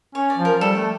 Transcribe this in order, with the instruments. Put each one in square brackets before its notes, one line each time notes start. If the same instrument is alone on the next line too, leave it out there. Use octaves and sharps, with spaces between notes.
[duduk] C#4 [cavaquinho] C#5
[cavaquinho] D5
[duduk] F3
[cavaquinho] A#4
[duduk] G3 [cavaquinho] A4
[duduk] A3